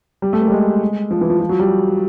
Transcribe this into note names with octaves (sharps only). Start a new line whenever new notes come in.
G3
A3
A#3
G3
G#3
F3
E3
F3
F3
F#3
G3